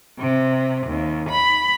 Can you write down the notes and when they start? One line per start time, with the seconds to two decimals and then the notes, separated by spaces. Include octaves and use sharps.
0.17 C3
0.86 D#2
1.29 B5